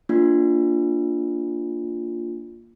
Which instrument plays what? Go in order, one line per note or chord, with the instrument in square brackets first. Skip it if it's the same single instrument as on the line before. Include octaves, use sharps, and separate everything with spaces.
[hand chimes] A#3 D4 F4